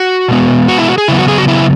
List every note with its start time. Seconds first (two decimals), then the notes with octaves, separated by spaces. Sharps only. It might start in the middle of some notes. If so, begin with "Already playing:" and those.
Already playing: F#4
0.28 B2 G#3 B3
0.68 F#4
0.78 E4
0.88 F#4
0.98 G#4
1.08 C#3 F#3 B3 E4
1.19 F#4
1.28 G#4
1.38 F#4
1.48 E4